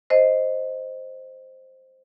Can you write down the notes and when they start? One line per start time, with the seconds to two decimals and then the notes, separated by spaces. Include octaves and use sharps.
0.10 C5 D#5